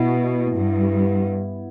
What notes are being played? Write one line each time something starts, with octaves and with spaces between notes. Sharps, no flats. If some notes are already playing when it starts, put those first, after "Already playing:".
Already playing: B2 B3 E4
G2